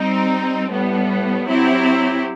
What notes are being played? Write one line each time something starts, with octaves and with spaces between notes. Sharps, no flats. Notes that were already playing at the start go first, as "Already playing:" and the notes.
Already playing: G3 C4 D#4
A2 G3 B3
F#3 C4 E4 G4